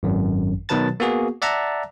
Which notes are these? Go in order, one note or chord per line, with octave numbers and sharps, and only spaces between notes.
G#1 F#2
B2 D#3 F#3 B4 A5 A6
A#3 B3 F#4 G#4
D5 E5 F#5 A5 A#5